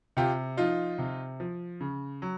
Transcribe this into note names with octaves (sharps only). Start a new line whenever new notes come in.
C3 F4 G4
F3 D#4 F4
C3
F3
C#3
F#3